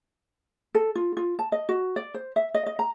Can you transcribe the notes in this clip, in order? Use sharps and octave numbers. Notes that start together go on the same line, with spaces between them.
A4
F4
F4
A5
D#5
F#4
D5
C5
E5
D#5
D#5
A#5